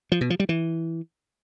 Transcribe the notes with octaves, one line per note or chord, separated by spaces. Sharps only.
F3
B2
F3
G3
E3